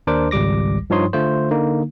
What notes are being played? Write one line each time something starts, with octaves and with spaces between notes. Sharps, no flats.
D#2 D4 A#4 C5 D6
G#1 C#2 G3 D6 A#6
G2 F3 D#4 C#5 C6 D#6
D3 A3 F4 C5
D3 A#3 D#4